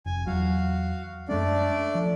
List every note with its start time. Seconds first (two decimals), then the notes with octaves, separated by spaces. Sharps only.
0.06 F1 G#5
0.26 E2 F#3 F#4 F5
1.29 F#2 G#3 A3 C#4 D4 D5
1.95 F3